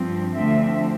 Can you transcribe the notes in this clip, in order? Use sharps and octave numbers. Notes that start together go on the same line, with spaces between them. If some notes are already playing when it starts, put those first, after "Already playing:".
Already playing: G2 F3 C4
D2 D3 F3 A3 C4 E5